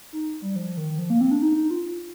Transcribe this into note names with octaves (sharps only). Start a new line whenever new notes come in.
D#4
G3
F3
D#3
F3
A#3
C4
D4
D#4
D#4
F4